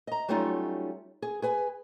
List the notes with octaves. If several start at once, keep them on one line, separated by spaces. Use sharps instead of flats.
D#5 A#5
F#3 G3 A3 C#4 D#4 F4
G#4
G#4 B4 G#5